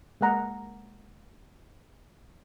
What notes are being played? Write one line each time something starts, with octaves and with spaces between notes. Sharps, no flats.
G#3 A#3 F#5 A#5